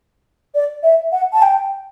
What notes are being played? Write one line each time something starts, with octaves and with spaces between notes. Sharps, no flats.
D5
E5
F#5
A5
G5